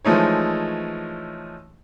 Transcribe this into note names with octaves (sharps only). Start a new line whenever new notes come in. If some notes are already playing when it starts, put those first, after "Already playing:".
E3 F3 G#3 A3 D#4 C#5